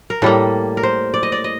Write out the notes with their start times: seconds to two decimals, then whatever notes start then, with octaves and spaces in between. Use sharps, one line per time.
0.10 A#4
0.22 A2 G3 A#3 A4
0.77 A#4
0.83 C5
1.14 D5
1.23 D#5
1.32 D5
1.44 D#5